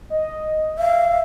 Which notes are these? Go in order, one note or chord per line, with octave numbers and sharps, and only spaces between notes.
D#5
E5 F5